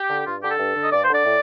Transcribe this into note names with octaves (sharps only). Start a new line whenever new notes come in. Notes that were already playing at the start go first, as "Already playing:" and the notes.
Already playing: G4
D3
G2 F4
D3 G4
A4
G2
D3
D#5
G2 D5
C5
D3 D5
A2